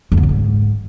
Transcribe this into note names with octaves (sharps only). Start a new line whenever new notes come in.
F2
D3
A2
G#2